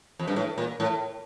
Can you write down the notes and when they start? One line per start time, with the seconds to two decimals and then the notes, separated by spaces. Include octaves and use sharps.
0.19 F2
0.28 G2
0.36 A2
0.58 A#2
0.80 A2